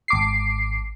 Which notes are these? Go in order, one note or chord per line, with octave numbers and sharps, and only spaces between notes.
G#1 D6 C7